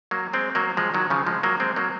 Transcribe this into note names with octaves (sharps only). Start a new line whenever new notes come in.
F#3 A#3
G#3 C4
F#3 A#3
F3 G#3
D#3 F#3
C#3 F3
F3 G#3
F#3 A#3
G#3 C4
F#3 A#3